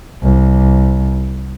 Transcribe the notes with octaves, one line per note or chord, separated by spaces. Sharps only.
C2